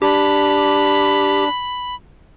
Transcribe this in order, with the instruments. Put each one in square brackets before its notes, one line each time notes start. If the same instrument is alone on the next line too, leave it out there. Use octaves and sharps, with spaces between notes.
[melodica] D4 [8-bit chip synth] G4 [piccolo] B5